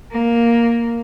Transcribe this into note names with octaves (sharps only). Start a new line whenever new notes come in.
A#3